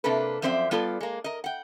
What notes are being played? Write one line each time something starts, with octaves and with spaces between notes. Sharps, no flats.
C3 A#3 D4 A4 B4
F#2 F3 C4 C5 D5 E5
G3 B3 F4 A4 D5
G#3 A#3
A#4 D#5
F#5 G5